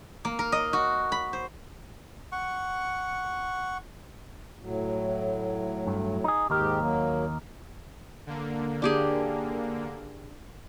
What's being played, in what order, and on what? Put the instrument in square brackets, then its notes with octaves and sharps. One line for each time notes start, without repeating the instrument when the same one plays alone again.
[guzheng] A#3
A#4
D#5
F#4
B5
C5
[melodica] F#5 C#6
[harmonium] A2 F#3
[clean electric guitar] G2
D#4 G#4
[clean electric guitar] D#2 D#4 A#4 [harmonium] G#2 G4
[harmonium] F#3 A#3
[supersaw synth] D3 A#3
[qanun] D4 G4 G#4